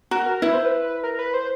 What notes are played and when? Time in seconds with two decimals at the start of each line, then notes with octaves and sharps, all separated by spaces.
0.11 F#4 A#4
0.26 A#4
0.42 E4 B4
0.53 C5
0.65 B4
1.04 A#4
1.19 B4
1.34 C5